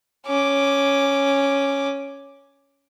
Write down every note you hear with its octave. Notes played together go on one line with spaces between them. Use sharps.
C#4 D6